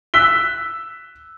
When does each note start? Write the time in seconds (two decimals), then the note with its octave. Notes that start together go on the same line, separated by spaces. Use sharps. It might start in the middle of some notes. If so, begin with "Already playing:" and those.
0.14 E6 F#6 B6 G7